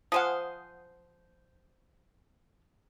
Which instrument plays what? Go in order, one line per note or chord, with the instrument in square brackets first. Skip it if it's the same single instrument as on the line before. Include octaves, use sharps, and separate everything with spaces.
[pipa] F3 C5 F5 [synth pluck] F#5 G#5 D#6